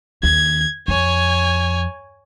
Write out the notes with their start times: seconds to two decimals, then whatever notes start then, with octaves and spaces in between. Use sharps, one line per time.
0.23 D#2 G#6
0.88 F2 C#5 G#5